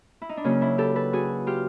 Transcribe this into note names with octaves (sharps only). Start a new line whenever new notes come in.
E4
D#4
D4
C#3 F#3 A#3 C#4
D4 E4
G4 A4
A4 B4
F#4 G#4
F4 G4